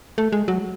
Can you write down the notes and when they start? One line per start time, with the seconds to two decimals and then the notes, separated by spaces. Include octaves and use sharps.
0.18 A3
0.32 G#3
0.48 F#3